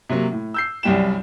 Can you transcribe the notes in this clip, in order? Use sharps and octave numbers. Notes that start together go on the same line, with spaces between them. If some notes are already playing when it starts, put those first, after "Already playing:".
C3 F#3 A#3
A2
E6 G6 C7
C2 F#2 G3 G5 E7